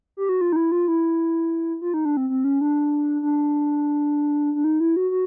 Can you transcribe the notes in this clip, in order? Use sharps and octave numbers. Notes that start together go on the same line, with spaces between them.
G4
F#4
F4
D#4
E4
F4
E4
F4
D#4
D4
C4
C4
C#4
D4
D4
D4
D#4
E4
F#4
F#4